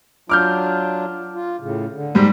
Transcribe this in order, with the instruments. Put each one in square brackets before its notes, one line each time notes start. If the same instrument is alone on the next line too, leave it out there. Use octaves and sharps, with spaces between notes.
[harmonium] F#3 D4 F4 [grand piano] D6 F6 G6
[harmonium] F4
A2 C#3
D3
[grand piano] G#2 G3